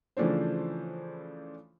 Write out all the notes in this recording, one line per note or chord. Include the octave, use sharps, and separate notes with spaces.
C#3 E3 F3 A3 D4 C5